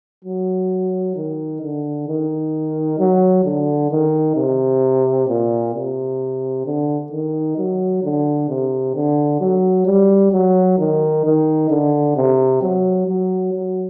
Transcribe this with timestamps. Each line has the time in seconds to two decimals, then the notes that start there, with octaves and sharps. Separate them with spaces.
0.24 F#3
1.16 D#3
1.62 D3
2.08 D#3
2.99 F#3
3.45 D3
3.91 D#3
4.36 C3
5.28 A#2
5.75 C3
6.66 D3
7.12 D#3
7.58 F#3
8.03 D3
8.49 C3
8.95 D3
9.41 F#3
9.86 G3
10.32 F#3
10.78 D#3
11.25 D#3
11.70 D3
12.16 C3
12.62 F#3
13.08 F#3
13.53 F#3